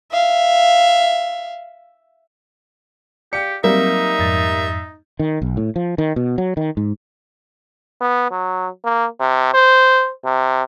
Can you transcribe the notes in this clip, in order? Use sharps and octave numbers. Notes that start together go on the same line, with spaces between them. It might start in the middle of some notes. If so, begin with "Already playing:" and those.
E5 F5
G4 D5 F5 G5 C#7
F#3 G3 A#3 C4 D#4 E5
F2 G#2 A6
D#3
B1
A2
F3
D#3
B2
F#3
D#3
G#2
B3
F#3
A#3
C3
C5
C3